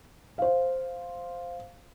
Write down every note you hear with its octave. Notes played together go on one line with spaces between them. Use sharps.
C5 F5